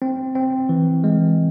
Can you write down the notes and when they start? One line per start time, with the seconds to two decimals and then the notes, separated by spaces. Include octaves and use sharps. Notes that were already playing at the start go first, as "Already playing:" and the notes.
0.02 C4
0.35 C4
0.69 E3
1.04 G#3